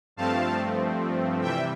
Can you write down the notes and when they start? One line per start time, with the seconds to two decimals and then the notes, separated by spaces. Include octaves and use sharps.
0.17 G2 F3 A3 C4 F5 A5
1.41 C3 E3 G3 E5 G5